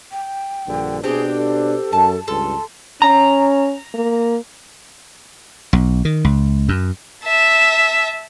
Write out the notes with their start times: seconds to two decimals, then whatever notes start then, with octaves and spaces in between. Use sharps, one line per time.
0.12 G5
0.67 A#1 G2 D3
1.04 B2 C4 D4 G4 G#4
1.35 A4
1.93 F#2 A5
2.28 C#2 G2 G3 A4 C6
3.02 C#4 A#5
3.94 A#3
5.73 B1
6.05 D#3
6.24 C#2
6.69 F#2
7.25 E5 A5